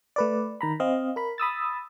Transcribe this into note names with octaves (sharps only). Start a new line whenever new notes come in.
A3 B4 D5
D#3 A#5 B5
C4 D#5 F5
A#4 B5
B5 D#6 E6 A6